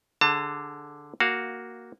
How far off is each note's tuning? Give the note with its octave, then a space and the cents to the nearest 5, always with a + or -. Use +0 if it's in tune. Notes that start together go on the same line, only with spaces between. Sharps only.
D3 +0 G#4 +0 A5 +35
A#3 +0 F#4 +0 F5 +10